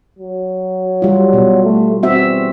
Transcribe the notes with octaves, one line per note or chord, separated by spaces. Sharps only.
F#3
G3 F4
B2
A3
E2 C4 F#4 E5